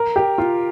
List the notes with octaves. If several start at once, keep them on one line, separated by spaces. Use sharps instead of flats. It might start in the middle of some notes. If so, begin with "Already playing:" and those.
Already playing: A#4
G4
F4